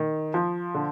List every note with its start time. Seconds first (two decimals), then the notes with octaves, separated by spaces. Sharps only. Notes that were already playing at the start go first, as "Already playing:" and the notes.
Already playing: D#3
0.34 F3
0.74 D3